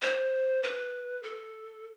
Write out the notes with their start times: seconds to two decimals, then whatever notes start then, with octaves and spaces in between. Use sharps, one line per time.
0.02 C5
0.63 B4
1.23 A4